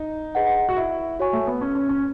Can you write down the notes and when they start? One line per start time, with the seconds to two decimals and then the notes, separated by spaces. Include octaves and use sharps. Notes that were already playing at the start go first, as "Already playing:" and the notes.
Already playing: D#4
0.35 G#4 B4 D#5 F#5
0.69 F#4
0.77 E4
1.19 F#4 C#5 G#5 C#6
1.33 A3
1.47 B3
1.61 C#4
1.75 C#4
1.89 C#4